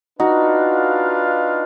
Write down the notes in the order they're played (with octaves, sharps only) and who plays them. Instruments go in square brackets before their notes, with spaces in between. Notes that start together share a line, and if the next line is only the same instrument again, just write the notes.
[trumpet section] D4 F4 B4 F5 [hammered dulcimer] D#4 F#4